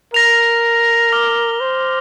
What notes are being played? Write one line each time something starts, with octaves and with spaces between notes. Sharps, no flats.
A#4 A#6 F7
D6 F6 A#6 G7
C5